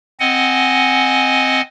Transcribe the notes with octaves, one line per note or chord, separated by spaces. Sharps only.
C4 D#5 F#5 G#5